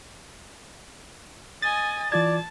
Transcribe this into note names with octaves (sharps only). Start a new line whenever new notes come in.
D#5 G#5 A6
E3 F4 D5 A5 G#6